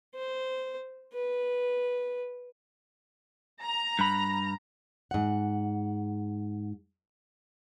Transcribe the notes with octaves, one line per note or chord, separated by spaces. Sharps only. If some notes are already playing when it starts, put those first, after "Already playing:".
C5
B4
A#5
G2 B5
G#2 F#5